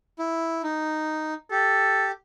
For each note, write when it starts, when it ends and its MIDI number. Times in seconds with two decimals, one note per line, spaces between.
0.19 0.62 64
0.63 1.34 63
1.51 2.11 67
1.51 2.08 69